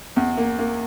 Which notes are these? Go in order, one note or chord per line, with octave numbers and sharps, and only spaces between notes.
E2
A#3
A#3